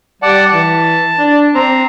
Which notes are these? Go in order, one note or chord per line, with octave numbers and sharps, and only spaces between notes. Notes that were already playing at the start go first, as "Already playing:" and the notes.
G3 D5 F#5 A5
E3 A5
D4
C4 A#5